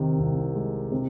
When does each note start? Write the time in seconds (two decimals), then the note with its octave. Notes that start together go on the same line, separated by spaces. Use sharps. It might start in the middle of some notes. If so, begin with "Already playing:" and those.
Already playing: C3 D#3
0.19 C2
0.55 G#3
0.91 C3